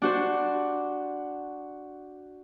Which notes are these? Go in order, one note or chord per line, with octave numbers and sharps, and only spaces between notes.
D4 F#4 C5